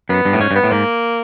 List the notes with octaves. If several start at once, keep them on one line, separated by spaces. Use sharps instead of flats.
F#2 B3
G2
A2
G#2 C#4
G2
B3
A2
G#2 A#3